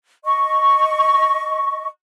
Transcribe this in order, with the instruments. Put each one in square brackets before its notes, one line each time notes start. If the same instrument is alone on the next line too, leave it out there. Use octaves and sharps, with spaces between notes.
[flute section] D#5 C#6